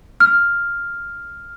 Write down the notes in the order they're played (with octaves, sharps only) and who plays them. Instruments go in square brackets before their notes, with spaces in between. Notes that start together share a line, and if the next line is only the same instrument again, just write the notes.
[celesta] F6